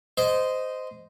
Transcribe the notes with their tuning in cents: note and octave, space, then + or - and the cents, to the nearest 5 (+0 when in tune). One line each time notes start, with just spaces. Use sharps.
C5 -15 D#5 +0